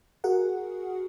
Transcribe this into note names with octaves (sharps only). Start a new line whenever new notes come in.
F#4 G#4 A#4 F#5